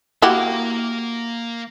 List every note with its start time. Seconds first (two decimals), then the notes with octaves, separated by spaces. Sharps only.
0.22 A#3 E4 F#4 G4 F5